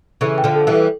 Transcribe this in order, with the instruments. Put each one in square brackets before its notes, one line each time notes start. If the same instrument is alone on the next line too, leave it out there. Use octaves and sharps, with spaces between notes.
[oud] C#3 E3 [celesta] A4
[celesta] G5
[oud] D3 F3
[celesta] A4
[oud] E3 G3
[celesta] A4